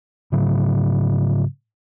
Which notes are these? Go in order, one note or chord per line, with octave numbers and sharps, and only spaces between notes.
G#2 C#3 F#3